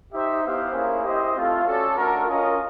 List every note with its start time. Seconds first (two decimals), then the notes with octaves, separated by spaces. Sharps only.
0.12 D#4 G4 C5 E5
0.43 B3 E4 G4 C5 F5
0.73 A#3 C#4 E4 G#4 C5
1.03 E4 G4 C5 D#5
1.34 A3 C4 F4 A4
1.64 C#4 F#4 A4 D5
1.95 A3 D4 F#4 A#4
2.26 C#4 F4 A#4 D#5